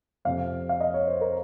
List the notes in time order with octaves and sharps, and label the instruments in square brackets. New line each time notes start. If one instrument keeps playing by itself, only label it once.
[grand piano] F2 C3 F3 F5
F5
D#5
C#5
C5
A#4